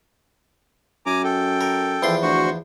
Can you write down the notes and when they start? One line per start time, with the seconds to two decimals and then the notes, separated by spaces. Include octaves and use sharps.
1.06 F#2 G#5 A#5 D6
1.24 A4 G5
1.61 A#4
2.03 E2 F3 C6
2.22 D2 F#4 C5 C#6